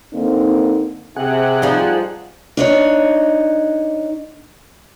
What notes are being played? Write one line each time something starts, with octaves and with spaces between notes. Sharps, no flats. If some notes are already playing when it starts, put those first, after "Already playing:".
D3 A#3 C4 D#4
C3 G#4 F#5
F3 G3 D#4
D4 D#4 C#5